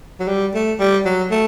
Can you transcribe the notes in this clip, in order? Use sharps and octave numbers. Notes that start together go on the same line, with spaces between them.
F#3
G3
A3
G3
F#3
A3